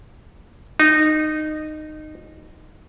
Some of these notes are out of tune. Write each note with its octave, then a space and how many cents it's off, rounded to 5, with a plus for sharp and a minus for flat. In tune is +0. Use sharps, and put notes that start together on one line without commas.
D#4 -15